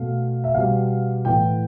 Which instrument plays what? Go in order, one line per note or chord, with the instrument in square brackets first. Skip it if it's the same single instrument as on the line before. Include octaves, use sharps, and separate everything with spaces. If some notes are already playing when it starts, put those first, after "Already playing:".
Already playing: [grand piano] B2 A3 F5
E5
B2 G3 B3 F5
A2 E3 B3 G5